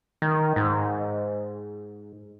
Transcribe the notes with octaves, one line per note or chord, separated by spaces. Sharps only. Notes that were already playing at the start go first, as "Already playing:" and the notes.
D#3
G#2